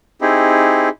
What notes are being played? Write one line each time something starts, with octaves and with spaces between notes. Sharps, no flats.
C4 D#4 E4 G4 G#4